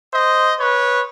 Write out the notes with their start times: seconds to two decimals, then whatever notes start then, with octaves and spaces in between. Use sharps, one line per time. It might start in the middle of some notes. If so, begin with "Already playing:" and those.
0.13 C5 D#5
0.59 B4 C#5